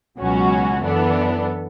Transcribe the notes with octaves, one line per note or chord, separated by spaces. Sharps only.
C#2 B2 F#3 C#4 F#4
F#2 E3 B3 D4 A4